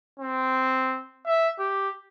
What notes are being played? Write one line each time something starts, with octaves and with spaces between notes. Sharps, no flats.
C4
E5
G4